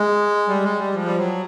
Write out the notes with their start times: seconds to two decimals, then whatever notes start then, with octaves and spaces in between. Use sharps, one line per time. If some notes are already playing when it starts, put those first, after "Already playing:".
Already playing: G#3
0.48 G3
0.64 G#3
0.79 G3
0.95 F3
1.05 G3
1.18 F#3